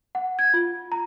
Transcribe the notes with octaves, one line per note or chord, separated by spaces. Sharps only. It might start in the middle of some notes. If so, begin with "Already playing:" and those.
F#5
G#6
F4
A#5